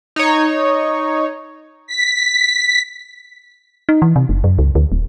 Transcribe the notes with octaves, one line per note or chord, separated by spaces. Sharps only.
D#4 C#5
B6
D#4
E3
C3
F#1
F#2
C#2
D2
D#1